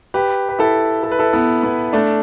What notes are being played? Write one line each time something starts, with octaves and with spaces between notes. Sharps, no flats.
G4 B4
B4
E4 A4
A4
B4
E4 A4
B3 E4
B3 E4
A3 D4